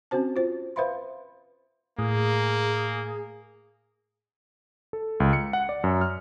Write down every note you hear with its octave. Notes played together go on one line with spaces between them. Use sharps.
C4 C#4 F#4 C5 A5
F4 C5
B4 C5 E5 F5 B5 C6
A2 A#3 G#4
A4
C#2
C#7
F#5
D5
F#2
F6